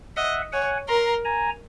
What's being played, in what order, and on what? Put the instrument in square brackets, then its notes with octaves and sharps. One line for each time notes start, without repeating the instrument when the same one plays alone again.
[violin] D#5 [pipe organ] E5 F#5
[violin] C#5 [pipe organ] F#5 G#5
[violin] A#4 [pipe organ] A#5 C6
[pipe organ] G#5 A#5